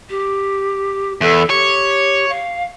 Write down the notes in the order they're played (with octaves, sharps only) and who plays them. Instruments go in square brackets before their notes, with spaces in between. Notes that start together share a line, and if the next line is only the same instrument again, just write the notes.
[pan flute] G4
[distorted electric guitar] E2 [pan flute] A4
[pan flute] G4 [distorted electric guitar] C#5
[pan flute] F5